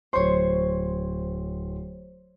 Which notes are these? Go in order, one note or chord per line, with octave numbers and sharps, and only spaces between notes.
D1 C5 C#5 C6